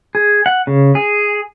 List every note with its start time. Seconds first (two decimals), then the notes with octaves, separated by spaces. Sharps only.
0.15 G#4
0.46 F#5
0.67 C#3
0.95 G#4